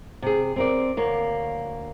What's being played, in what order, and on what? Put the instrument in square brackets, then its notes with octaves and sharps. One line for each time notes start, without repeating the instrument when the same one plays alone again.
[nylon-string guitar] C3 G#4
C4 A#4 D5
D2 A#3 C#5